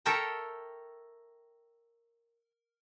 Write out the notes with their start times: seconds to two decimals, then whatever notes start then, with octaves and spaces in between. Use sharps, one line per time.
0.05 A4 A#4 C#5 E5 G5 A#5